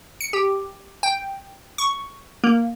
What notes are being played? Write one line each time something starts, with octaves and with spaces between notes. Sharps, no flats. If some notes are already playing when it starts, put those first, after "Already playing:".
C#7
G4
G5
C#6
A#3